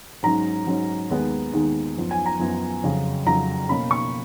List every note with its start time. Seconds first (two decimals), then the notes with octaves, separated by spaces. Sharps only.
0.23 G#2 F#3 C#4 A#5
0.67 G#2 F#3 C#4
1.10 D#2 D#3 G#3 B3
1.53 D#2 D#3 G#3 B3
1.97 F#2 F3 B3
2.11 G#5
2.26 A#5
2.39 F#2 F3 B3
2.83 F2 C#3 F#3
3.26 F2 C#3 F#3 A#5
3.69 B2 A#3 C#4 B5
3.91 C#6